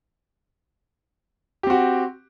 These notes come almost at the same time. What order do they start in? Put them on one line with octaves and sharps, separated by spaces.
G4 C4 F#4